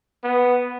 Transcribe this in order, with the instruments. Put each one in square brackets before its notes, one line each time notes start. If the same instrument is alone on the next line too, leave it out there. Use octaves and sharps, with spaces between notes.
[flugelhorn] B3